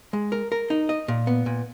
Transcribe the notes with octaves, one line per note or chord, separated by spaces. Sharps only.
G#3
A#4
A#4
D#4
D#5
A#2
B3
A#2